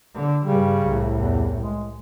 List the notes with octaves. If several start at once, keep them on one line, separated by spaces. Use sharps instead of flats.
D3
G2 C#3 G3
C2 A2
E2
G#3